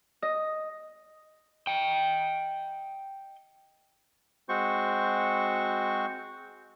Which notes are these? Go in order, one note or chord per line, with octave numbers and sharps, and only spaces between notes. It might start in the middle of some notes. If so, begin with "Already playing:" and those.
D#5
D#5 G5
G#3 C4 F#4 C5 C#6